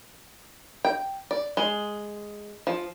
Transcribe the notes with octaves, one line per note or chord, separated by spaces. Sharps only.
G5
D5
G#3
F3